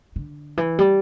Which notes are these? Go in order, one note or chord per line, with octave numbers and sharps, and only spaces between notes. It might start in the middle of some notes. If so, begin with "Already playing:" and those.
D3
E3
G3